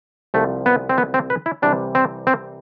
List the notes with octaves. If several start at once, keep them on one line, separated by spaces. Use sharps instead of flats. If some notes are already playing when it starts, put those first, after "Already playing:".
C2 C3 F3 A3
B3
C4
B3
C4
B4
E4
C2 C3 E3 G3 D4
C4
C4